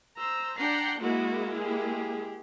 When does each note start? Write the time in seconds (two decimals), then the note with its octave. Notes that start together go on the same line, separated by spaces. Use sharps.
0.18 C5 A#5 E6
0.58 D4 F#5 G5 A#5 C7
1.01 G#3 A#3 E4 F#4
1.58 G4 G#4